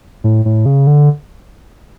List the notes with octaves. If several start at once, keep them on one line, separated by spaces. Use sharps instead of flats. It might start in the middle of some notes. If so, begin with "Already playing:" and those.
A2
A2
C#3
D3